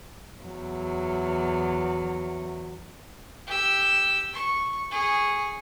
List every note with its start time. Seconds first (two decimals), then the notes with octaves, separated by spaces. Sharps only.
0.44 E2 F#3
3.47 G4 E6
4.33 C#6
4.91 G#4 C#6